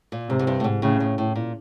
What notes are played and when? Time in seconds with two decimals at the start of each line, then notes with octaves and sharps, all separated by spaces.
0.12 A#2
0.29 G#2 C3
0.39 G#2
0.47 G2
0.60 A2
0.64 G#2
0.82 A2 C#3
1.00 A2
1.18 A2
1.36 A#2